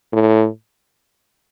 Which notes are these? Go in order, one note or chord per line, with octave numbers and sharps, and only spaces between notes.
A2